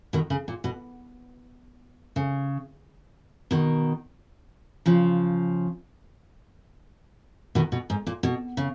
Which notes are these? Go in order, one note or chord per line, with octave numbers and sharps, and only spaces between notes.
B2 D#3
C#3
A#2
B2
C#3
B2 D#3
C#3 F3
B2 D#3
B2
G#2
A#2
B2
C#3